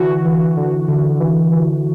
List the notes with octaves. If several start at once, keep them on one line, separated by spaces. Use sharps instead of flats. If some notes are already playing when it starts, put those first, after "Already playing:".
Already playing: D3 E3 F#4
E3
D3
D3
E3
E3